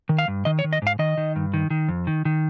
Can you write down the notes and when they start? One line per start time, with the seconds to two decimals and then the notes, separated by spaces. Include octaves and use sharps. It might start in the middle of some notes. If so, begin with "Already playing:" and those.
0.09 D#3
0.18 F5
0.28 G2
0.45 D#3 D#5
0.59 C#5
0.64 D#3
0.73 D#5
0.82 G#2 F5
0.99 D#3 D#5
1.17 D#3
1.36 G2
1.54 D#3
1.70 D#3
1.89 F2
2.07 D#3
2.25 D#3